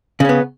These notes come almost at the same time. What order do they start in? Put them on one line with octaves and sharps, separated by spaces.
C#3 C#4 B3